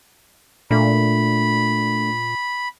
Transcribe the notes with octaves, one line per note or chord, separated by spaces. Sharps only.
A#2 A3 D4 B5